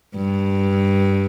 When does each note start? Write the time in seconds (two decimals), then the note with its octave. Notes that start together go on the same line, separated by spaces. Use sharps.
0.16 G2